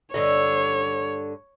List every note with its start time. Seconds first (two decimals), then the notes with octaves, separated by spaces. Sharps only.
0.14 G2 D3 C#5 D#5